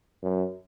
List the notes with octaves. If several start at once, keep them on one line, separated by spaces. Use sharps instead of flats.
F#2